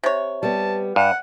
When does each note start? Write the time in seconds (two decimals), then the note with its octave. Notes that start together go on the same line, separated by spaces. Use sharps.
0.03 C3 C#5
0.43 G3 B3 A5
0.96 G2 F#5